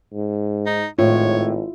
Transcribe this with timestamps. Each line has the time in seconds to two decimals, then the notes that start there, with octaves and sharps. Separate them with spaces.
0.14 G#2
0.67 D#4
0.99 G#1 A2 F4 C#5